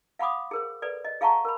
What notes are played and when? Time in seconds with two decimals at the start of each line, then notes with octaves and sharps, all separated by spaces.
0.19 F5 F#5 B5 D6 D#6
0.51 G#4 A#4 C5
0.82 A4 B4 D5
1.05 D#5
1.21 G#4 F5 F#5 A5 A#5 C#6
1.45 A#4 B5